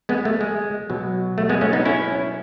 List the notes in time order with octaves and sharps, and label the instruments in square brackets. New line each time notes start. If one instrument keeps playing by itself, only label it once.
[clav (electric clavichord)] G#3 B3
A3
G#3
B2 F#3
A3
G#3 B3
A3 C#4
B3 D#4
C#4 E4